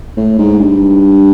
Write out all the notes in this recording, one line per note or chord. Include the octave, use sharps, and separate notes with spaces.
A2
G#2
G2